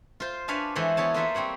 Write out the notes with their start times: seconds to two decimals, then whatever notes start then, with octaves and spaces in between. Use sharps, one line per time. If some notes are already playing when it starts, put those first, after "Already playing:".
0.20 F4 C5
0.48 D4 B4 C#5 F5 G#5 A5
0.75 E3 G#3 F#4 A4 C5 C#5
0.97 B3 E4 C#5 A5
1.14 A#3 F4 A4 B4 C5 E5
1.35 G3 C4 C#5 F#5